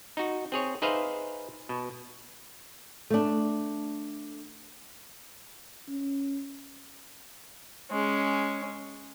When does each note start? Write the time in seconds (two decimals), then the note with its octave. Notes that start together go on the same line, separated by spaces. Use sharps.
0.17 D#4 F#4
0.52 C4 G#4 C#5
0.82 D#4 G#4 B4 C5 E5 F5
1.69 B2
3.10 A3 D4
5.88 C#4
7.91 G#3 C#4